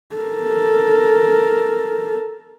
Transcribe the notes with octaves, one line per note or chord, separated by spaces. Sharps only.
A4 A#4